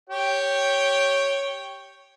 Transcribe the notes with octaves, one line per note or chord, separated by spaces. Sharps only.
G4 C#5 G5